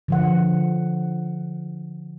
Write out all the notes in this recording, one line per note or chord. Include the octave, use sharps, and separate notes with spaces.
D3 F3 F#5